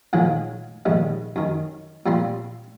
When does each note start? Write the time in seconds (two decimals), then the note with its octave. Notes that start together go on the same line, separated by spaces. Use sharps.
0.13 A#2 D#3 F3 F#3 G#3 A#3
0.86 A#1 G#2 D#3 G3
1.36 F#2 D#3
2.06 A#2 F3 G3 C4 C6